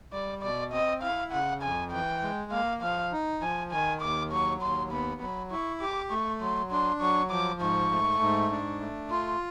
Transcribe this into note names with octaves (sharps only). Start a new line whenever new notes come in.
G3 D5
B2 D5
C4 D#5
E4 F5
C#3 F#5
F2 G#5
E3 G5
G#3
A#3 F5
F3 F5
D#4
F3 G#5
D#3 G#5
D#2 D6
F#3 C#6
D#2 C6
B3 B5
F#3 B5
E4 C#6
G4 D6
A3 C#6
F#3 C6
D4 C6
F#3 C#6
F3 D6
G#2 C#6
A3
G#2
D4
A3
F4 C6